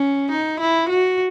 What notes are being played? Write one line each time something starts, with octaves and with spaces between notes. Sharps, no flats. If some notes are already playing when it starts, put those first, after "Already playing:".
Already playing: C#4
D#4
E4
F#4